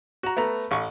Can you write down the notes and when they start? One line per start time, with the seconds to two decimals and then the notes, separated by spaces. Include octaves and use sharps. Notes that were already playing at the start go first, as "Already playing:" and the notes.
0.23 F#4 A#5
0.37 A3 B3 A#5
0.71 A1 C#6